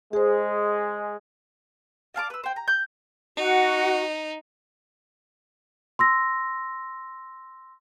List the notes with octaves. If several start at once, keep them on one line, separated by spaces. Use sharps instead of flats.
G#3 G#4 C5
D5 F5 A5 D6
B4 E6
C5 G5
A#5
G6
D#4 F#4
C6 E6 A#6